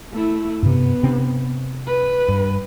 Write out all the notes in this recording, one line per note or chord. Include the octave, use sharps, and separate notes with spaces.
A3 E4
G2 C3 B3
C3 C4 D4
B4
G2